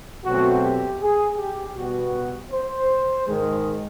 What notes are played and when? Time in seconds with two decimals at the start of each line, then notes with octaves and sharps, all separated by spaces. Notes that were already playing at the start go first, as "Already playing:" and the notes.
0.25 B2 F#3 A3 C4 F#4
0.63 G4
1.00 G#4
1.38 G4
1.76 B2 G3 B3 F#4
2.51 C5
3.27 G#2 D#3 G#3